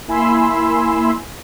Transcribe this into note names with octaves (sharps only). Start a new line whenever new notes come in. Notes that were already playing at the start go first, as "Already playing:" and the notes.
A#3 E4 G#5 B5 C6 E6